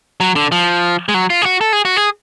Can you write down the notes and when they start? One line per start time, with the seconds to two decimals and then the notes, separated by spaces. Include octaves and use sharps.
0.20 F#3
0.36 D3
0.52 F3
1.09 G#3
1.14 F#3
1.30 F4
1.42 G#4
1.46 F#4
1.61 A4
1.73 G#4
1.85 F#4
1.97 G#4